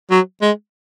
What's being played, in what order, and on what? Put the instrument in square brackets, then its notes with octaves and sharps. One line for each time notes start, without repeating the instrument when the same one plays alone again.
[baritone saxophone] F#3
G#3